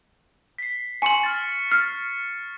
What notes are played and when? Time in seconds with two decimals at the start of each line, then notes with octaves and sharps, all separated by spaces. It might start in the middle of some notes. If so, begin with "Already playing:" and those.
0.58 B6 C7
1.02 G#5 C6 C#6 C#7 F#7
1.23 F6 A6
1.71 F6 A6 C7